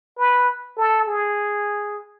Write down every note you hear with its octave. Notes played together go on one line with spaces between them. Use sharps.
B4
A4
G#4